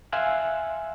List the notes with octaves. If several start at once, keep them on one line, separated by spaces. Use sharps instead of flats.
E5 F5 G#5 C6 E6 F#6